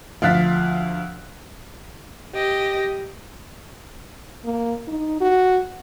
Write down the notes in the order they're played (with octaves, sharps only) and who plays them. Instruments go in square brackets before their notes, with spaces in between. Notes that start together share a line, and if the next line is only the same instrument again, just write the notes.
[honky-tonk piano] D2 F3 F5 F#6 A6 B6
[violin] G4 D#5
[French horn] A#3
D#4
F#4